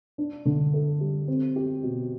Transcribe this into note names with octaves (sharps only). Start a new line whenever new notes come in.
D4
D3
A4
G3
C4
G4
B2